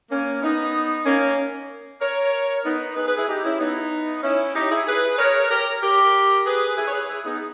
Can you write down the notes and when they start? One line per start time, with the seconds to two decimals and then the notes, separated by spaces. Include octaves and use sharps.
0.11 A#3 C#4
0.42 B3 D#4
1.06 A#3 C#4
2.01 A#4 C#5
2.65 B3 D#4
2.97 G#4 B4
3.07 G#4 B4
3.18 E4 G#4
3.29 D#4 G4
3.45 C#4 E4
3.60 B3 D#4
4.23 C#4 E4
4.55 D#4 G4
4.71 E4 G#4
4.87 G#4 B4
5.19 A#4 C#5
5.51 G4 A#4
5.82 G4 A#4
6.46 G#4 B4
6.77 E4 G#4
6.87 C#5
6.93 G#4 B4
7.09 E4 G#4
7.25 B3 D#4